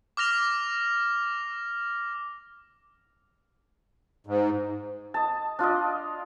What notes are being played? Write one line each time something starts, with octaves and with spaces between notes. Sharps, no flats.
D6 F6 A#6 F7
G#2
D#5 A5
D4 F4 D5 D#5